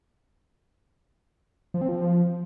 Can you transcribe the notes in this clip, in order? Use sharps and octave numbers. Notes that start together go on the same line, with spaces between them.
F3
C4
F3